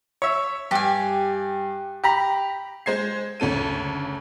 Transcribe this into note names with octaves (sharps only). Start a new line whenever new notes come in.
C#5 E5
G2 G4 G#5
G4 A#5 B5
G#3 C5 G#6 C7
F#1 D2 C#4 A4 D#7